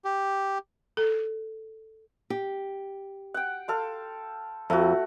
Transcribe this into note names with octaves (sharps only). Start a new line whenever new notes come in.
G4
A4
G4
F#5 G5
A4 F5 C6
F2 A3 F#4